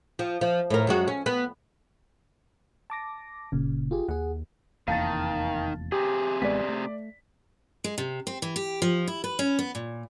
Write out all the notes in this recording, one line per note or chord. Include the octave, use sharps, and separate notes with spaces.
F3
F3
A2 A#4
F#2 G#3 F#4
C#4
B3
A5 D6 A#6
F#1 A#2 C#3
F4 G4 G#4
D#2 G#4 F#5
F1 E2 D#3 A#3 F5 A5 A6
C3 G4 G#4
A1 G#3 B3 D5 B6
A3
G#3
C3
C4
E3
G4
F3
E4
B4
C#4
B3
A#2